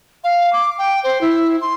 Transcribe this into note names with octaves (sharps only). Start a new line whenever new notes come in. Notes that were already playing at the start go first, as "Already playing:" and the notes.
F5
D6
G5
C5
E4
C6